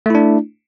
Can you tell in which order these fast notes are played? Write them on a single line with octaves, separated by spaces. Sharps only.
A3 E4 D4